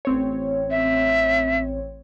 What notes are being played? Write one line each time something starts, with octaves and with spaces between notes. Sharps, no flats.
A1 C4 C#5
E5